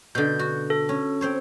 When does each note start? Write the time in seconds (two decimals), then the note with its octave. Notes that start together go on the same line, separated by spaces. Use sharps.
0.15 B2 D3 G6
0.39 F#4
0.70 A4
0.89 C#4
1.21 C4 C5 C#5